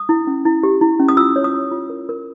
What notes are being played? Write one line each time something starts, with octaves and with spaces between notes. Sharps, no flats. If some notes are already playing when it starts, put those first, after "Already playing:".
Already playing: D#6
E4
C#4
E4
G4
E4
C#4
D#6
F4 E6
C#5
D#6
F4
F4
A#4
A#4